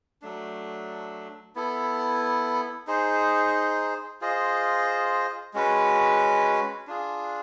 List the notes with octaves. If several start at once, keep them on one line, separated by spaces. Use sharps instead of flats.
F#3 A3 D4
B3 E4 A4
D#4 G#4 C5
F4 G#4 C5 D#5
G#3 C#4 F#4 B4
D4 F4 G#4